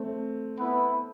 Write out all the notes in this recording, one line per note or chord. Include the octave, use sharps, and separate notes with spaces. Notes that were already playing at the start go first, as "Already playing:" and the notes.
Already playing: A3 C4
B3 E4 B4